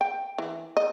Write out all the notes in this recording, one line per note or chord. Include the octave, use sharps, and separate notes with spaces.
G5
E3
D#5